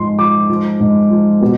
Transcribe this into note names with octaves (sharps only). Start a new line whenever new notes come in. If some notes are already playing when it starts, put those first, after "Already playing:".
Already playing: G#2 F3 C6
F3 D6
F3
G#2
F3
B2